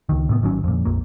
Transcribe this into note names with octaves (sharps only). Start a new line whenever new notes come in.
C#2 D#3
A2 C3 A3 B3
G#1 D#3 F#3 C#4
F2 A#2
A#1 F2 A#3